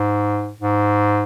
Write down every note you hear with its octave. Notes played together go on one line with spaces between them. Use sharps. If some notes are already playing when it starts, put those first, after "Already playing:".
Already playing: G#2
G#2